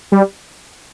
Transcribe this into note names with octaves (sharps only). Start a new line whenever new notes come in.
G3